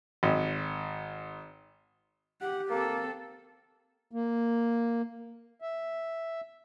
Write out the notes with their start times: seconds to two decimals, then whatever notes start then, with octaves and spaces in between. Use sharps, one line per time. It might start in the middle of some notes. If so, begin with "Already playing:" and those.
0.23 G#1
2.41 G4 F#5
2.70 A#3 C4 A4
4.12 A#3
5.62 E5